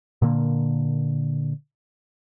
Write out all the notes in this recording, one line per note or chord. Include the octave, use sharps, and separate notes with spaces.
A#2 D3 A#3